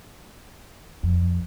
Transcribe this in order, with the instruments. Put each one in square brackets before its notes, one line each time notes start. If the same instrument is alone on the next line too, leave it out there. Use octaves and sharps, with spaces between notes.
[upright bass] F2